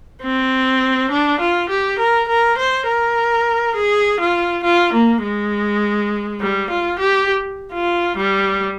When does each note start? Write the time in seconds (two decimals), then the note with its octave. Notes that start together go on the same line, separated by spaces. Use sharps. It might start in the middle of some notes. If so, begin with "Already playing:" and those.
0.22 C4
1.11 D4
1.40 F4
1.70 G4
1.99 A#4
2.29 A#4
2.58 C5
2.87 A#4
3.76 G#4
4.20 F4
4.64 F4
4.93 A#3
5.23 G#3
6.41 G3
6.70 F4
6.99 G4
7.73 F4
8.17 G3